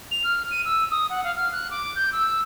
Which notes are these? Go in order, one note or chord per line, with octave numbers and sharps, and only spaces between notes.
F7
F6
D#7
E6
D#6
F#5
F5
F6
F#6
D6
G6
E6